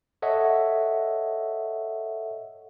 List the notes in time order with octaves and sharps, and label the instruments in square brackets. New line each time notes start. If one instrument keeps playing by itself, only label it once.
[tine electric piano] A4 C#5 D#5 E5 F#5